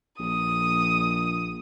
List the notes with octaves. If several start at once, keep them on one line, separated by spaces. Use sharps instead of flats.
A#1 D#6